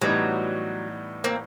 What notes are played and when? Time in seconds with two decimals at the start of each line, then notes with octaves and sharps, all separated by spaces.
0.02 A2 E3 F#3 G3 B3 D#4
1.24 A#3 C4